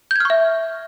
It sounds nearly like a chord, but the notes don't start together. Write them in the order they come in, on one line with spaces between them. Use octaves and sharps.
G6 G#6 F6 C#6 E5